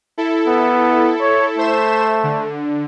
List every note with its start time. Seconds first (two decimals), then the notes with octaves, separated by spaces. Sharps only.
0.18 E4 A4
0.47 B3
1.21 C#5
1.58 A3 C5 E5 E7
2.23 D3